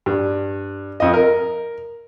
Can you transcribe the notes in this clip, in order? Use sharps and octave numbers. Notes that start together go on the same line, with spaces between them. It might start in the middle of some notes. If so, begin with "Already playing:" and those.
G2
F2 D#5
A#4